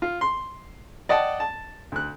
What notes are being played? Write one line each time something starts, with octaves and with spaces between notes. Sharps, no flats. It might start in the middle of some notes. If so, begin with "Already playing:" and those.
F4
C6
D5 D#5 F#5 G5 A5
A5
D2 F#6